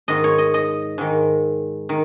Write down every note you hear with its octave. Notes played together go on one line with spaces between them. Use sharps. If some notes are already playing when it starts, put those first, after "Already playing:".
G#2 D#3 D#5
C#5
D#5
D#5
G#2 D#3
D#3